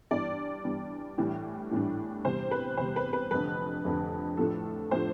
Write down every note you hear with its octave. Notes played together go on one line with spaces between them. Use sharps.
G2 E3 G3 B3 D5
G2 E3 G3 B3
A2 E3 G3 D4
A2 E3 G3 D4
E2 C3 G3 C5
B4
E2 C3 G3 C5
B4
B4
F1 F2 D3 B4
F1 F2 D3
A2 F3 A3 D4 A4
A2 F3 A3 D4 C5